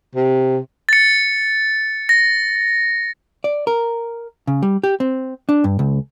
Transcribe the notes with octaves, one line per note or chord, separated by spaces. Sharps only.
C3
A6 C#7
A#6
D5
A#4
C#3
G3
G4
C4
D4
G2
C#2